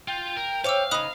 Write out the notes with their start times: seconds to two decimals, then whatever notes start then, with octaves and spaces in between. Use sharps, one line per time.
0.08 F4 G5
0.37 A#4
0.64 C5 C#5 E5 F5 D6 E6
0.91 C#3 D#4 D#5 B5 D#6 F#6